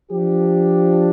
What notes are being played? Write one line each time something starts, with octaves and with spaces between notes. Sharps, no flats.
F3 D4 G4